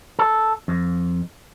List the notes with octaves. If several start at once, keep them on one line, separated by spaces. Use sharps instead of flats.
A4
F2